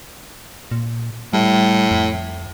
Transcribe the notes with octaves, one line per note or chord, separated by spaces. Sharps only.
A#2
A2 G3
F2